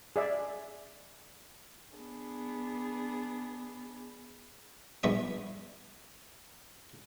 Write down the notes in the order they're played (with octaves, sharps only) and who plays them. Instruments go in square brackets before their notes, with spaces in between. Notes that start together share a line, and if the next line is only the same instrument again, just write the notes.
[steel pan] G#4 D5 E5
[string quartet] B3 D4 G#4
[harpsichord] A#1 G2 B3 E5 D#6